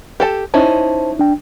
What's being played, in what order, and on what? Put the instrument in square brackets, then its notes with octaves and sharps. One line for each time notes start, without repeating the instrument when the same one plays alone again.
[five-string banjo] G4 A4 A5
[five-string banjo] C#4 D#4 E4 [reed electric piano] C5 A5
[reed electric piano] D4 G5